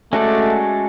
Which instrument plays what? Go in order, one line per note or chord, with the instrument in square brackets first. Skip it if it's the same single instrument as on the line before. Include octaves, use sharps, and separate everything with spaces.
[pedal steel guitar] G#3 C#4 F#4 A4 D5 [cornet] A3